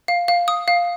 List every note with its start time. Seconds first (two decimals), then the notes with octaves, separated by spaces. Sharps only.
0.08 F5
0.28 F5
0.48 D#6
0.68 F5